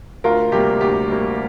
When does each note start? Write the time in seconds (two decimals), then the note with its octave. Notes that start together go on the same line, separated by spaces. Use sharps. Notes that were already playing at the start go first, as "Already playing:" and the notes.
0.24 D2 F4 A#4
0.52 C3 G3 A#3 G4
0.81 D2 G4
1.10 C3 G3 A#3